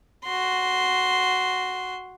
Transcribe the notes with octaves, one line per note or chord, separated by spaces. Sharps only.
F#4 C6